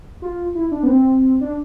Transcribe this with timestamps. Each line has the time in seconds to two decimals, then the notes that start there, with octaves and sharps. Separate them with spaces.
0.22 F4
0.55 E4
0.71 D4
0.83 B3
0.87 C4
1.41 D4